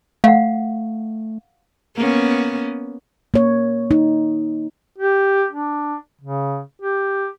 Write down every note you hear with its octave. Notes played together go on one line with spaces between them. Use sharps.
A3 F5 F#5
A#3 B3 C#4
A#3 C#5
D#4
G4
D4
C#3
G4